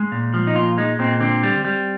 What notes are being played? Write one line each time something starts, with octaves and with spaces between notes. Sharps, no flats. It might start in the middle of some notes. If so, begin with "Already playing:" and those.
Already playing: G#3
A#2
F3
D#4
A#2 F4
G#3 D#4
A#2 C4
D3 C4
G3
G3